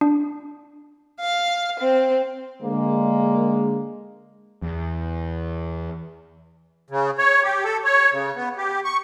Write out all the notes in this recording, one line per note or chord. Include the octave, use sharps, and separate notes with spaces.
D4
F5
C4
D3 G#3 A#3
E2
C#3
C#5
G4
A4
C#5
C#3
B3
G4
C#6